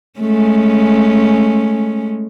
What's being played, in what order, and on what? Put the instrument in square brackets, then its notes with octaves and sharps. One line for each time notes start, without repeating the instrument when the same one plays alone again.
[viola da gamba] G#3 A3 C#4